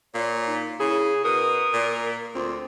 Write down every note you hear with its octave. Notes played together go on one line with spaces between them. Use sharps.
A#2 F4 C#5
D#4
C#3 E4 G#4
B2 A#4 D#6
A#2
D2 C4 F4